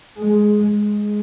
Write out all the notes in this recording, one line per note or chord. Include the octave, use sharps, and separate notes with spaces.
G#3
G#3